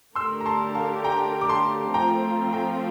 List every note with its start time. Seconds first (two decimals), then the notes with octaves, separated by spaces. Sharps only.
0.15 D3 A3 D4 G4 A#4 C6 E6
0.41 A#5
0.46 A5 C6
0.75 F5 A5
1.04 G5 A#5
1.41 D6
1.49 A5 C6
1.94 F3 A3 C4 F4 G5 A#5
2.53 G5 A#5